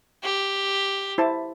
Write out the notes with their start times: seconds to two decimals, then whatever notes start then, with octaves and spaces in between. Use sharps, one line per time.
0.24 G4
1.18 E4 C5 A5